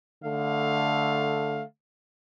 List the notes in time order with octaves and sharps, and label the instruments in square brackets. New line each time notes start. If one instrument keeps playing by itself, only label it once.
[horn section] D3 A3 F5